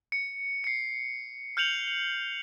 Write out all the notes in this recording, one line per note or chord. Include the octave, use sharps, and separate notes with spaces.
C#7
C7 C#7
F6 G6 C#7 F7 F#7
F7